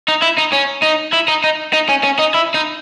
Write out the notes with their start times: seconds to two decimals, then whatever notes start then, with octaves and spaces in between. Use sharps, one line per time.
0.08 D#4
0.22 E4
0.38 D#4
0.53 C#4
0.83 D#4
1.13 E4
1.28 D#4
1.44 D#4
1.73 D#4
1.89 C#4
2.04 C#4
2.19 D#4
2.34 E4
2.54 D#4